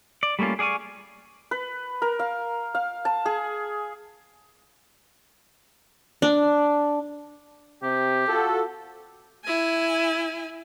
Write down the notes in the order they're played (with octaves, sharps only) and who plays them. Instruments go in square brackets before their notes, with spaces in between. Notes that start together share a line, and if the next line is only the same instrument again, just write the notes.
[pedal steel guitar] D5
G3 A3 A#3 C#4 F4
G#4 D5 F5 G#5 C#6
[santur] B4
A#4
F5
F5
A5
G#4
[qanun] D4
[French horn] C3 [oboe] G4
[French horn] F4 [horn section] F#4 A4
[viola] E4 G#5